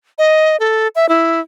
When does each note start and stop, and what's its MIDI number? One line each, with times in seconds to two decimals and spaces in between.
0.18 0.57 75
0.60 0.88 69
0.95 1.09 76
1.09 1.40 64